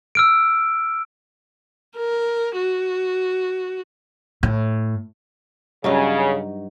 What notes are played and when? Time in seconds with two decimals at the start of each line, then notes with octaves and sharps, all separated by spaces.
0.15 E6 F6 D7
1.96 A#4
2.56 F#4
4.43 A2
5.84 G2 C#3 F#3 D#4